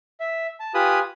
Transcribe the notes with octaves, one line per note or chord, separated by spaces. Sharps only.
E5
A5
F4 G4 B4 G#5 B5 D#6